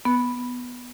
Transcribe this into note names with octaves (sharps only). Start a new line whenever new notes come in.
B3